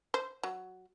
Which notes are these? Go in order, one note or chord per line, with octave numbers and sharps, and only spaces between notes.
C5
F#3